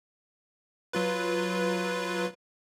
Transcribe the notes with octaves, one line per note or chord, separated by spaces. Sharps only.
F#3 F4 B4